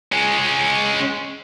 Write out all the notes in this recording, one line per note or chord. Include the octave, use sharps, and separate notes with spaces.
G#3 C#4